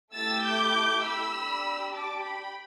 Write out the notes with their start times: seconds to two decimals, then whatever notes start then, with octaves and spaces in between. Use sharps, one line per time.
0.15 A3 E4 G4 E6 A6
0.44 D6 G6
1.04 B5 E6
1.34 D4 G4
1.93 A5 D6
2.22 G5 B5